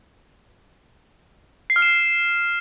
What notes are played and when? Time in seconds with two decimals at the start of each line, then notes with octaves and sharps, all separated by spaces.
1.70 C7
1.76 F6
1.82 E7